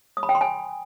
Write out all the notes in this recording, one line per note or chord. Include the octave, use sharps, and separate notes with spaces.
D#6
B5
G5
C6
G#5